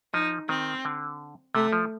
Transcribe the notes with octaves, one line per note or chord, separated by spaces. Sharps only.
F3 D#4
D#3 C4
D3
C3 A3
F3